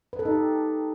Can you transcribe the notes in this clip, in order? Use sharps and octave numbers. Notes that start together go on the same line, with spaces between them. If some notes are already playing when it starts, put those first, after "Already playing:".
B4
A4
D#4
G4